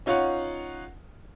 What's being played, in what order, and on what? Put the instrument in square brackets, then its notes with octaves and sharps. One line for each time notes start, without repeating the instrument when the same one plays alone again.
[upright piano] C#4 D#4 F4 C#5 F#5